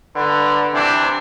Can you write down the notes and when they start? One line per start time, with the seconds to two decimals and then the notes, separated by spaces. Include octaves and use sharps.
0.16 D3 B4
0.73 C3 E3 D4